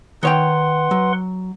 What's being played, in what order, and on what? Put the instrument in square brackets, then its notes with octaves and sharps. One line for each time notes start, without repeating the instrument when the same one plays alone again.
[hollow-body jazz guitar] D#3 C#5 G5 [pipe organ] B4 F#5 C6
[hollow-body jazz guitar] F#3